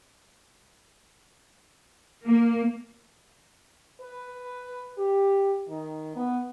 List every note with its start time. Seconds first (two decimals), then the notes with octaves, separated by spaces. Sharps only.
2.27 A#3
4.01 B4
4.98 G4
5.69 D#3
6.16 B3